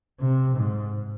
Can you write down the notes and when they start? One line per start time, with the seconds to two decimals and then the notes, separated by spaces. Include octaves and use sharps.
0.20 C3
0.56 G#2